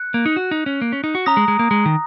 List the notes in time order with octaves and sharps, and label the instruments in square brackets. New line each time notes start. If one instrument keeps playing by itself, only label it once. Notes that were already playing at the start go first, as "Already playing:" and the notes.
Already playing: [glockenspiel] F#6 C#7
[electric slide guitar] A#3
D#4
F#4
D#4
C#4
A#3
C#4
D#4
F#4
[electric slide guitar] C#4 [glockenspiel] A#5 D#6 A#6
[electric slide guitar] G#3
G#3
A#3
G#3
D#3